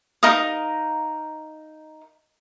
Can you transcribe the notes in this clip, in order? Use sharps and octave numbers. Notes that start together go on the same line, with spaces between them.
D#4 A#4 F5 D#6